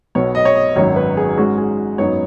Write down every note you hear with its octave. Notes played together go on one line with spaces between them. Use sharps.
B1 B2 B3 C#5
D#5
C#5
D#5
G#1 F#2 D#3 F#3 C#5
B4
G#4
G#2 G#3 C#4 F#4
G#4
G#1 F#2 F#3 B3 D#4 C#5